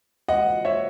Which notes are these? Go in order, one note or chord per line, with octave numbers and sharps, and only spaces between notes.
D#5 F#5
C#5 E5